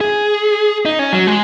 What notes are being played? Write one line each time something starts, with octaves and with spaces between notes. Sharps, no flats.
G#4
D#4
C#4
F#3
G#3